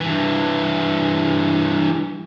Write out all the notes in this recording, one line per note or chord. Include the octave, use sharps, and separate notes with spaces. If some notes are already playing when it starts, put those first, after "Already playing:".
G2 E3